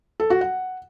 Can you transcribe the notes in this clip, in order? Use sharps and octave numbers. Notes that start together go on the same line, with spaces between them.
A4
F#4
F#5